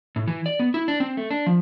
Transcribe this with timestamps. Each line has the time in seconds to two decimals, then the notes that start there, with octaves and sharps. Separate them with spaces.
0.16 A2
0.28 E3
0.46 D5
0.59 B3
0.74 E4
0.88 D4
1.00 C4
1.17 A3
1.31 D4
1.46 F3